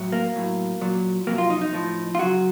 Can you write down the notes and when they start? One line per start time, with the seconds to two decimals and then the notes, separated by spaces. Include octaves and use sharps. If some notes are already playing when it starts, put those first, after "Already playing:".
Already playing: A2 F#3
0.12 A#3
0.36 A2 F#3
0.81 A#2 F#3
1.27 F2 C3 F#3 A#3
1.38 F4
1.50 D#4
1.61 D#4
1.73 A2 F3
2.15 F4
2.19 F#2 C#3 F#3 F#4